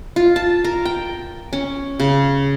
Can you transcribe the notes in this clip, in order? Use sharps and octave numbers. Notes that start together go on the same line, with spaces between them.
F4
A5
A#4
G5
C#4
C#3